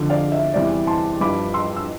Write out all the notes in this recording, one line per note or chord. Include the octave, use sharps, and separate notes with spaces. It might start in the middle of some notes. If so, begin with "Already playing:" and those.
Already playing: F2 D3 F3
D5 F5
E5
E2 C3 E3 G3 D5
A5 C6
G2 F3 B5 D6
C6 E6
E6